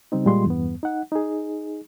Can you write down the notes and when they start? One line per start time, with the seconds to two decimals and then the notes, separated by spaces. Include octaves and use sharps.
0.12 C#3 G3 C4 D#4
0.26 A#2 G3 G#3 F4 C6
0.46 E2 G2 B3
0.83 D#4 F#5
1.12 D#4 G#4